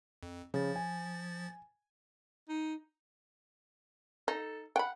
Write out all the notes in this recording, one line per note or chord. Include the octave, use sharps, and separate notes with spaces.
F2
C#3 F3 A6
G#5
D#4
D#4 A4
F#5 G5 B5